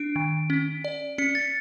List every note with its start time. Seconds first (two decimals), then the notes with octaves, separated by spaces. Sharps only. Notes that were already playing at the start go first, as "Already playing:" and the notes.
Already playing: D4 D7
0.16 D#3
0.50 C#4
0.84 D5
1.18 C#4 C#7
1.35 A6